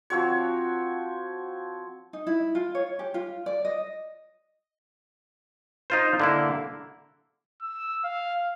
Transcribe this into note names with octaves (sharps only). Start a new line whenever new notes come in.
F3 C4 F#4 C#5
D#4
E4
F4
C#5
G4
F4
D5
D#5
D#4 F4 C5
D3 A#3 E4
E6
F5